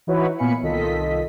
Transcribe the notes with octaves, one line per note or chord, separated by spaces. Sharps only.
E3 D#4 E4 F#4 B4 C#5
A#2 B3 F5 G#5 B5 C#7
C2 D#3 F4 A4 D#5 B6